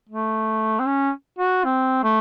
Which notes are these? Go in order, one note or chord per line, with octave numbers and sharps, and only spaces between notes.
A3
C4
C#4
F#4
C4
A3